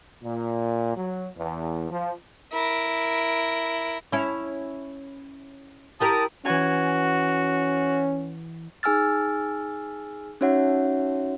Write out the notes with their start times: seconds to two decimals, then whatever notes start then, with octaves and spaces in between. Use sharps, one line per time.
0.23 A#2
0.96 F#3
1.36 E2
1.90 F3
2.53 E4 A#4
4.12 C#4 E4
6.01 E4 G4 A#4 A5 D#6
6.46 E3 C#4 F#4 G#5
8.83 D#4 G#4 G#5 E6 F6 A6
10.41 C#4 D#4 F#4 C#5 E5 F#5